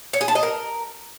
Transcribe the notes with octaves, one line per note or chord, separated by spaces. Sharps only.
C#5
G#4
A5
D#5
A#4